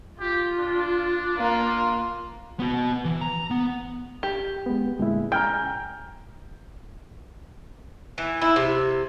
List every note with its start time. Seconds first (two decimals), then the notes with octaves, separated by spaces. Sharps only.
0.20 F4 G4
0.59 D4
1.38 A#3 F4
2.59 B3 F#4
3.05 E3
3.21 A#5
3.50 B3
4.23 G4
4.66 G#3 B3
4.99 D2 A#2 G#3 E4
5.32 G5 G#5 A#5 F6 G6
8.18 E3
8.42 E4
8.56 C3